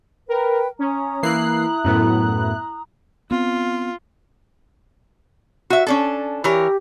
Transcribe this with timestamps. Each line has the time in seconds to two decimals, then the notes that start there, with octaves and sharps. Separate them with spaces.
0.28 A#4 B4 G5
0.79 C#4 A#5 D#6
1.23 E3 A#3 E4 F#6 C7
1.84 F#2 A2 B3
3.31 B3 C4 F4
5.70 F#4 E5
5.87 C#4 D4 A4
6.44 E3 G4 A#4 C#5